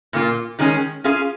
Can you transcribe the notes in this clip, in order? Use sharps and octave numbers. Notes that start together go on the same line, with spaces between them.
A#2 A#3 F4
D#3 G#3 C#4 G#4
C#4 F4 G#4 F5